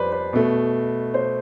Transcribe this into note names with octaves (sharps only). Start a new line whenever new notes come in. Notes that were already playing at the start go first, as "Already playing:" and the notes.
Already playing: F2 G3 B4 C5 D5
B4
B2 A3
C5